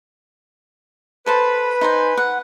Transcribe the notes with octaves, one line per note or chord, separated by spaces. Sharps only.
A4 B4 C5 A5
D#4 C5 G#5
F#5